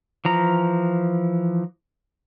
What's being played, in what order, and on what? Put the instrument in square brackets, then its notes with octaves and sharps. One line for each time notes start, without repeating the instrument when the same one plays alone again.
[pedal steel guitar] E3 F3 A#5